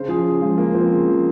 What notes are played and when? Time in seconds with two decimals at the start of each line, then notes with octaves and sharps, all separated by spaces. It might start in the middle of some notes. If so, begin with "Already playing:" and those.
Already playing: C#3 C5
0.08 F3 G#4
0.26 C#3
0.41 F3 G#3
0.58 C#3 A#3
0.74 F3 C4
0.91 C#3
1.08 F3